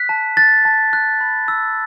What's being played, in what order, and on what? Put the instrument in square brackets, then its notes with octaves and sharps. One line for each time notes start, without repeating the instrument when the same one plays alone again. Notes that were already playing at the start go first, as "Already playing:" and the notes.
Already playing: [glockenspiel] F#6 B6
A5
F#6 A6
A5
F#6
B5
E6